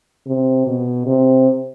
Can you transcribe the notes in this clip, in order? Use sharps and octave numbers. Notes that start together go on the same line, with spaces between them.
C3
B2
C3